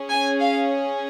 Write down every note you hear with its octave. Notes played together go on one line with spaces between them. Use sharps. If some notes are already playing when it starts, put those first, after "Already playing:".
Already playing: C#4 G#4
G#5
F5